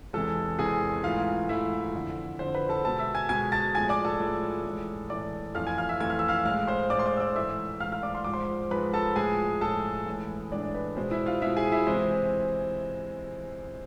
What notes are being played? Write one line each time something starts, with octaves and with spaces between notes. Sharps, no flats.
E2 C3 E3 G#3 A4 A5
E2 C3 E3 G#3 G#4 G#5
G#2 E3 A3 F4 F5
G#2 E3 A3 E4 E5
F2 D3 F3
F2 D3 F3 C5
B4 B5
A4 A5
B2 G#3 A4 A5
E5 E6
G#5 G#6
B2 G#3 G#5 G#6
A5 A6
A2 F3 G#3 G#5 G#6
D5 D6
A4 A5
A2 F3 G#3
A2 E3 G#3
A2 E3 G#3 D5 D6
F2 E3 A3 F5 F6
G#5 G#6
F5 F6
E5 E6
F2 E3 A3 G#6
F6
E6
F5 F6
A2 G#3 F5 F6
C5 C6
A2 G#3 D5 D6
C6
D5 D6
E6
D5 D6
G#2 E3 A3 E5 E6
G#2 E3 A3 F5 F6
F5 F6
D5 D6
C6
G#2 F3 G#3 D6
C5 C6
G#2 F3 G#3 B4 B5
A4 A5
A2 F3 G#3 G#4 G#5
A2 F3 G#3 A4 A5
A2 E3 G#3
A2 E3 G#3 D4 D5
B4
B2 G#3 C5
E4 E5
F4 F5
B2 G#3 E4 E5
G#4 G#5
E4 E5
C3 E3 G#3 C5